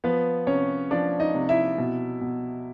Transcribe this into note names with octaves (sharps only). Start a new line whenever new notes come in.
F3 B3 B4
C3 C#4 C#5
F3 D4 D5
D#4 D#5
C3
E4 E5
B2
B2